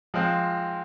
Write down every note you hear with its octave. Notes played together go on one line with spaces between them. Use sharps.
F3 G#3 C4 F4